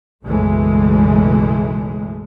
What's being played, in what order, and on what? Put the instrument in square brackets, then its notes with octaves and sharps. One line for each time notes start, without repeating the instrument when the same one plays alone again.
[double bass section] B1 F#2 C#3 E3 G#3 A3